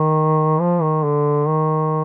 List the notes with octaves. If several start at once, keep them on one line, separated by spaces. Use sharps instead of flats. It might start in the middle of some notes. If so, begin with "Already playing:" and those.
Already playing: D#3
F3
D#3
D3
D#3